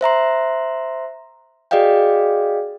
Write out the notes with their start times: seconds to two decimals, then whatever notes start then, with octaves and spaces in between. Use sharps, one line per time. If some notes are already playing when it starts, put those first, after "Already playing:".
0.01 C5 E5 A#5 C6
1.71 F#4 G#4 D5 D#5 F5 G5